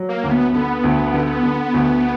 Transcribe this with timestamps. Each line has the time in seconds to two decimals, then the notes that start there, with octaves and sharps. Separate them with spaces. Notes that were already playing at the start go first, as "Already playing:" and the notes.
Already playing: F#3
0.09 A#3
0.23 D2
0.31 B3
0.53 D3 B3
0.84 D2
1.14 D3
1.43 D3
1.74 D2